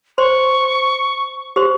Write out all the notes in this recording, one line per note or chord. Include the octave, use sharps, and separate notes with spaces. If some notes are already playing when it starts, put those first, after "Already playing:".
C5 C6 C#6
G4 C5 C6